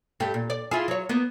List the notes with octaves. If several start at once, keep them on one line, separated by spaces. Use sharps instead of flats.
G2 A3 G4
A#2
D5
E4 F4 G#4
F#3 C#5
A#3 B3